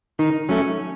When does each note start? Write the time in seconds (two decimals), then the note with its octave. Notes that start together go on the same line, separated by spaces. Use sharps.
0.19 D#3 D#4
0.49 F#3 A3 C#4